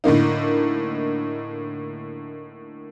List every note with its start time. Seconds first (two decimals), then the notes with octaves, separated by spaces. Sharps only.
0.04 A2 D3 A#3 D#4